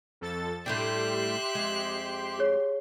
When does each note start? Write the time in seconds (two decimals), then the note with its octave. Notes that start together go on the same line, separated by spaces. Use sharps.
0.21 F2 A4 A6
0.66 A2 G3 D4 G4 E5 C6 F#6
1.55 F2 G#3
2.39 G#4 C#5